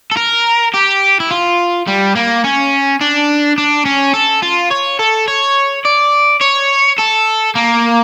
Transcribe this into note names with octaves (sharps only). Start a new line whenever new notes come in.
A4
A#4
G4
E4
F4
G3
A#3
C#4
D4
D4
C#4
A4
F4
C#5
A4
C#5
D5
C#5
A4
A#3